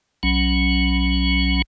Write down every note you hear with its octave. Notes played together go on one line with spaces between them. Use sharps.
B1 F#3 C#4